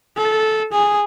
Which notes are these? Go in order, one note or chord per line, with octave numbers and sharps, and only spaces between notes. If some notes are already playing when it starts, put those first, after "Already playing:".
A4
G#4